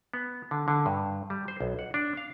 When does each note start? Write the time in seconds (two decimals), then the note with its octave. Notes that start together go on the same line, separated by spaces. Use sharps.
0.14 B3
0.51 D3
0.68 D3
0.86 G2
1.30 G3
1.48 C5
1.61 B1
1.79 F#5
1.94 D4
2.17 F5